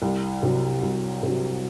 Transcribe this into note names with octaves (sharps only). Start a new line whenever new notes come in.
C2
C3 F#3
C2
C3
F#3